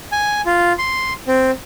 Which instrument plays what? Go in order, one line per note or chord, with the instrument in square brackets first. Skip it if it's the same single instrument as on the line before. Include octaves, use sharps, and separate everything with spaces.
[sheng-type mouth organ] G#5
F4
C6
C4